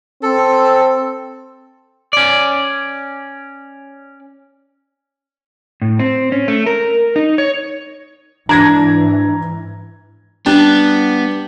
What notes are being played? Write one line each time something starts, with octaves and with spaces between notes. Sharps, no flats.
C4 A4
C#4 D5
A2
C4
C#4
A3
A#4
D#4
C#5
G#2 E3 D4 A#5 G#6 A#6
G3 B3 D4